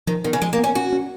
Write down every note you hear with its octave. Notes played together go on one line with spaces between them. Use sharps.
D#3 F3
D#3 B3
C#3
F3 G#3
A#3
B3
C#4
C#4 F#4
C#4